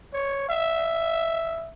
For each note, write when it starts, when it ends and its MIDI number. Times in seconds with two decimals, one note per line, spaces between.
0.13 0.48 73
0.49 1.71 76